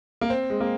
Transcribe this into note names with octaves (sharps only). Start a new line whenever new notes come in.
A#3
C4
G#3
A#3